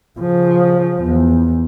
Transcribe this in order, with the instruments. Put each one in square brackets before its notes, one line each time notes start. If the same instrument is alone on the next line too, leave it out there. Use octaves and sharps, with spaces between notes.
[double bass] C#3 F3
E2